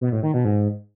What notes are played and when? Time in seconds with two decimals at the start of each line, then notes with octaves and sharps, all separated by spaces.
0.01 B2
0.12 A2
0.23 D#3
0.34 B2
0.45 G#2